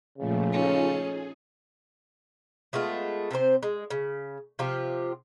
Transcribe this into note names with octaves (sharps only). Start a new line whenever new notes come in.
A#2 C#3 F3 A3
C#4 D#4 F4 A4
G#4
G#3 A3 B3 F4
C3 C4 A4 C5
G#3
C#3
C3 F3 F4 G4